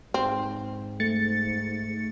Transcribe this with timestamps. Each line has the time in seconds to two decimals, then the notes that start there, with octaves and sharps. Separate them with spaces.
0.14 G#2 C4
1.00 A3 A6 C#7